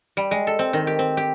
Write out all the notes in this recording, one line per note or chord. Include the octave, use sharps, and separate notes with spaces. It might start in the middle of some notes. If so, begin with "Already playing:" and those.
G3
G#3
A4
C4
D#3
G4
C4
G4